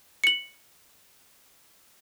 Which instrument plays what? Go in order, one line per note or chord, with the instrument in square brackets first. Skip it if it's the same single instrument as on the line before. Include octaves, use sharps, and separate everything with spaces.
[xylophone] C#7 F#7